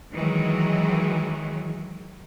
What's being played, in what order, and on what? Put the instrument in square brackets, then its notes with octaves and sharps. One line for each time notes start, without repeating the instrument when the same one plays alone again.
[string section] D#3 E3 F#3 G#3